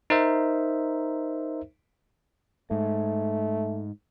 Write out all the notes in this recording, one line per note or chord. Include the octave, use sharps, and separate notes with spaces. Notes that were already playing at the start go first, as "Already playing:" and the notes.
D#4 A#4 C5 E5
G#2 A3